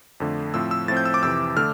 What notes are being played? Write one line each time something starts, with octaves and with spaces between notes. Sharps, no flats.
F2 D3 A3
A2 F3 C4 E6
E6
A2 F3 C4 A6
G6
E6
D6
F2 C3 E3 E6
D3 A3 D4 F6